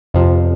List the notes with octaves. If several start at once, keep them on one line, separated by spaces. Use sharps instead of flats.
F2 C3 F3